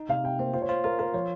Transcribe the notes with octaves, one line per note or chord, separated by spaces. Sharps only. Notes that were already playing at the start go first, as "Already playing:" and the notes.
Already playing: D#4
C3 F5
C3 G5
A#3 C5
F4 C5
C#5
F4 C5
F4 A#4
F4 A#4
F3 C#5